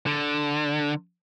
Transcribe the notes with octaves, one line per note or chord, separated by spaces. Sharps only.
D3